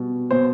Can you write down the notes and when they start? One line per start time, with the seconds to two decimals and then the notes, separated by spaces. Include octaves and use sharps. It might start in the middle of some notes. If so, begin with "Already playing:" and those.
Already playing: B2 G3
0.31 B2 C5